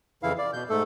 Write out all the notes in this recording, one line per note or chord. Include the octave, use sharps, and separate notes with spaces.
F2 C#3 E3 E4 F5
D5
B2 G6
G#2 A3 A4